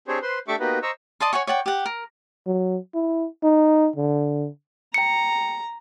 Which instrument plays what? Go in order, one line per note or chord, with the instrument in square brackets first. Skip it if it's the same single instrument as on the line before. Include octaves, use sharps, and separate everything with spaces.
[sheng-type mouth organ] C4 D4 G4 G#4 C5 C#5
B4 C5 C6
A3 D4 G4 E5 C#6 D6
A#3 B3 D#4 F#4 G4 B4
C5 D#5 A#5 C#6 E6
[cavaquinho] D5 D#5 A5 C6
C#5 F#5 G#5 C#6
C#5 D5 F#5 G5
G4 F#5
A#4
[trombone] F#3
E4
D#4
D3
[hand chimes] G5 C#7 [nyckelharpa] A#5